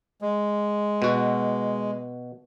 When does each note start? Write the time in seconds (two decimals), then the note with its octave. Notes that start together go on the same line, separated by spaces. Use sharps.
0.22 G#3
1.02 B2 F#4